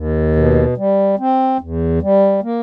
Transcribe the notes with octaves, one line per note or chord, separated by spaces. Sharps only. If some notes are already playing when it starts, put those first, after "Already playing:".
Already playing: D#2
B2
G3
C4
E2
G3
A#3